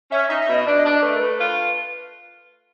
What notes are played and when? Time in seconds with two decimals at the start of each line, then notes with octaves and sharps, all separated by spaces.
0.11 C#4 E5
0.30 D#4 E5
0.42 E5
0.48 B2
0.54 D#5
0.66 D4 D5
0.79 D#5
0.85 D4
0.91 D5
1.03 A3 B4
1.15 A#4
1.20 A3 B4
1.39 F4 B4